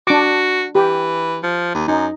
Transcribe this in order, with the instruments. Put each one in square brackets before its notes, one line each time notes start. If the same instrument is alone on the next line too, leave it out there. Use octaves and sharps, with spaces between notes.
[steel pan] D4 D6 [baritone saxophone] F#4
[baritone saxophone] E3 [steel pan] G4
[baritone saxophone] F3
D#2
[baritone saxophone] F#2 [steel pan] D#4